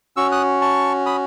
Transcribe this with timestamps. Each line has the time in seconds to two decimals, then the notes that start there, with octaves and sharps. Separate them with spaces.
0.16 C#4 F#4 C#6 E6
0.32 D#6 F#6
0.61 A5 C#6
1.06 B5 D#6